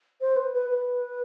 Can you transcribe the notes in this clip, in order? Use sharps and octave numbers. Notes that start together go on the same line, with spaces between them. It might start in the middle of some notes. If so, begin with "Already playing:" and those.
C5
B4
B4
B4